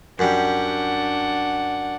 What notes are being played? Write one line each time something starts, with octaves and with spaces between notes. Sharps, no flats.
F#2 G3 D4 F#5